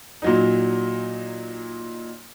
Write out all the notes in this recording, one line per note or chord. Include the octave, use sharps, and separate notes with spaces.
A#2 F#3 D#4